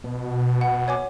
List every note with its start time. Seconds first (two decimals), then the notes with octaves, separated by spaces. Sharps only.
0.04 B2
0.61 F#5
0.88 C#5 G#5 D6